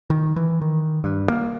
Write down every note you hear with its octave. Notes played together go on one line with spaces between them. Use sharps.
D#3
E3
D#3
G2
A#3